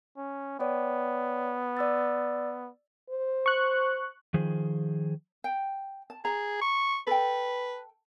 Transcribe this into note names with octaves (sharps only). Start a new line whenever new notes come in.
C#4
B3 C#5 D5 G5
D5 E6 A6
C5
C#6 F#6
D#3 F3 G#4 C5
G5
A5
G#4 A#5
C#6
A4 B4 G5